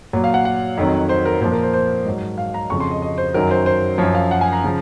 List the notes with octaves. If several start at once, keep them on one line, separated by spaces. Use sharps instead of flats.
A#2 F#3
F5
F#5
F#5
F2 D#3 F#3
C5
A#4
A#2 F3 C5
A#4
C5
C5
G#2 F#3
F5
A#5
F2 C#3 F3 C#6
C6
D#5
D#5
C5
F#2 D#3 F#3 A#4
C5
C5
F#2 F3 C#5
F5
F#5
G#5
A#5
C#3 F3